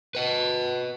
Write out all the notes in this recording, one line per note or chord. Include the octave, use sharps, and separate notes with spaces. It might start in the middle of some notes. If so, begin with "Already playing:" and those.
B4 D#5